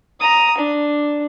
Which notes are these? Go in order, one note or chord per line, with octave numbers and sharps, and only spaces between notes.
A#5 D#6
D4